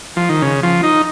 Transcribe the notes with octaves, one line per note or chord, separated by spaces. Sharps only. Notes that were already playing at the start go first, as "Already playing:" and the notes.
F3
D#3
C#3
F3
D#4